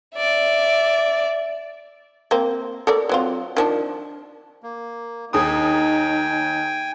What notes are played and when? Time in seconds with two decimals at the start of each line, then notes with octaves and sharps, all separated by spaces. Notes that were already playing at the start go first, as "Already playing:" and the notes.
0.15 D5 E5
2.31 A#3 C4
2.87 A4 A#4 D5
3.09 F#3 C4 F4
3.57 D#3 F3 D4
4.63 A#3
5.33 D#2 D#4 G#4 G5 G#5 D#6